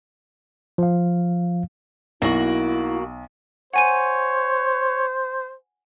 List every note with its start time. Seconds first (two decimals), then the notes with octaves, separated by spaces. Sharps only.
0.78 F3 F5
2.22 B1 A#3 E4 F#4
3.73 C5 C#5 F#5 G#5 D#7